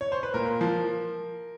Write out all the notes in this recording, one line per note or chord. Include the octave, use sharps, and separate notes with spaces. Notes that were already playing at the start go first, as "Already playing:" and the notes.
C#5
C5
B4
A#2 A#4
F3